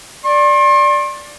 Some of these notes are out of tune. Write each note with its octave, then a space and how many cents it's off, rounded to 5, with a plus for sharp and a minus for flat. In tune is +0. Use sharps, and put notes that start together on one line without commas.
D5 +0 C6 +45